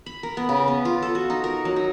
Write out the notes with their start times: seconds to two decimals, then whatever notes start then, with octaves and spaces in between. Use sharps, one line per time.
0.06 B5
0.23 A#4
0.37 B3
0.49 C#3
0.68 B3
0.85 F4
1.02 A4
1.15 F#4
1.30 D#4
1.44 A#4
1.65 F#3
1.76 D#4